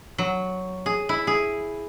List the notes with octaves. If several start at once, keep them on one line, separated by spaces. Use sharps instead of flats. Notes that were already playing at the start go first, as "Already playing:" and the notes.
F#3
G#4
E4
G#4